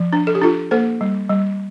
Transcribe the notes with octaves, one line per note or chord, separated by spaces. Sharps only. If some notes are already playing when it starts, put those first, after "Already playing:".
Already playing: F3
D4
A4
G4
D4 F4 A4
A#3 A4 C5
G3
G3